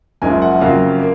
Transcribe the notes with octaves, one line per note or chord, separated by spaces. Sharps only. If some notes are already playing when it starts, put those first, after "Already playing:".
F#1 F#2 F3 G#3 G#5
F#5
F2 C#3 F#3 A#3 F5
A#3